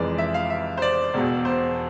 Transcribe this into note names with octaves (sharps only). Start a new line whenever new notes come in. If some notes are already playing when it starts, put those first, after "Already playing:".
Already playing: F1 F2 E3 G#3 D5
E5
F5
E5
C5
D5
E1 E2 B2
C5